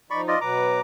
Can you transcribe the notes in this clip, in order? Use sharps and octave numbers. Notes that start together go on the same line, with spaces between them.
F3 D#4 D5 B5 C#6
F4 D5 D#5
B2 F#3 B4 A#5 D6